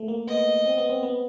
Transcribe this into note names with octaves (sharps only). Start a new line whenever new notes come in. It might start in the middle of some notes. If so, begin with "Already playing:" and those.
Already playing: A3
A#3
B3 D#5
C4
B3
C4
B3